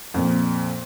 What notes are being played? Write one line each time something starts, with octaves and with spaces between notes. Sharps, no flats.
F2 A#2